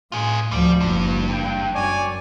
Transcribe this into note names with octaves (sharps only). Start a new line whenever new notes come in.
A2 F4 G#4
D2 F3 G3
F#1 G2
G5
F#2 C#5 D5 G#5